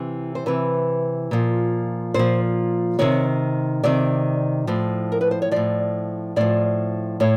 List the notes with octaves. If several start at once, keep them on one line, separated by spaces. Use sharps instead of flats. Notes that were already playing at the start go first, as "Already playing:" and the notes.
Already playing: C3 E3
C5
C3 E3 B4
A#2 F3
A#2 F3 C5
C3 D#3 C#5
C3 D#3 D5
A2 F3
A#4
B4
C5
C#5
A2 F3 D5
A2 F3 D5
A2 C#5